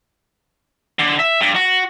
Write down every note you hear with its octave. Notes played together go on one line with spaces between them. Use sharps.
D3
E5
G2
F#4